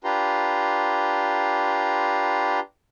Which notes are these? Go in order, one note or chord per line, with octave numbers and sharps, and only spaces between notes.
D4 F4 G4 B4 A#5 C6